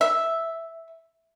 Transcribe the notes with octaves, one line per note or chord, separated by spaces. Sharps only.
E5